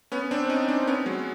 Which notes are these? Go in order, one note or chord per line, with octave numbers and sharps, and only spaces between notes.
B3 C#4
C4 D4
C#4 D#4
C4 D4
B3 C#4
F#3 G#3